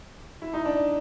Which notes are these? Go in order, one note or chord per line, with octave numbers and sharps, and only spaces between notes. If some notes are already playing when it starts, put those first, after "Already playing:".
E4
D#4
D4